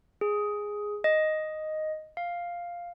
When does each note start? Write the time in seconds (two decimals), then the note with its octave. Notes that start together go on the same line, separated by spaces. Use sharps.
0.21 G#4
1.04 D#5
2.17 F5